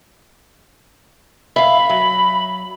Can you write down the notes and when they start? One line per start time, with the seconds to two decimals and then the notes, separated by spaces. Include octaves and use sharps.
1.56 E5 F5 B5
1.89 F#3